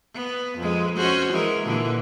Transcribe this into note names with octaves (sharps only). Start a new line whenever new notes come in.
B3
F2 G#3
C#4 F#4 C5
E3 G#3 A#4
A#2 D3 E3